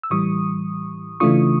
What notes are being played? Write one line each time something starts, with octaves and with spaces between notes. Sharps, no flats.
E6
A2 E3 G3 C#6 D#6
C#3 E3 A3 D4 F4 C#6 D#6